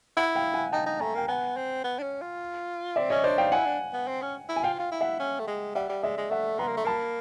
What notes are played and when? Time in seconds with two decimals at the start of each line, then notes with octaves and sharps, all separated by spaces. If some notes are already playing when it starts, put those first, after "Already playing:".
0.17 E4 E5 F#5
0.36 F5 G5
0.54 F#5 G#5
0.73 D#4 G5 A5
0.87 D#4
1.00 A3 G#5 A#5
1.15 A#3 G5
1.28 B3 F#5 G#5
1.57 C4
1.84 B3
1.99 D4
2.03 C#4
2.22 F4
2.96 C4 D5 E5
3.10 C#4 C#5 D#5
3.24 D4 C5 D5
3.38 D#4 F5 G5
3.52 E4 F#5 G#5
3.66 D4
3.93 B3
4.08 C4
4.22 C#4
4.49 E4
4.56 G#5
4.63 F4 F5 G5
4.79 F4
4.92 E4
5.01 E5 F#5
5.20 C#4
5.40 A3
5.48 G#3
5.75 G3 E5 F#5
5.89 G3
6.03 G#3 D5 E5
6.18 G#3
6.31 A3 E5 F#5
6.59 B3 A#5 C6
6.68 A#3
6.77 A3
6.85 A#3 A5 B5